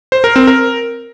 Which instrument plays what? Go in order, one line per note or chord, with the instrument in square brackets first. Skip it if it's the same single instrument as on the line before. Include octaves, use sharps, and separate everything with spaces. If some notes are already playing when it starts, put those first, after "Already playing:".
[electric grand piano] C5
A#4
C4
A#4